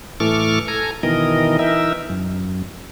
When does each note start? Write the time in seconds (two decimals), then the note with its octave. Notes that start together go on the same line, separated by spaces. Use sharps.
0.20 A2 E3 A4 C#6 D6 F6
0.68 A4 G#5 A#5
1.03 B2 D#3 E3 A#4 D#5
1.59 E3 D#4 A#4 E5
2.09 F#2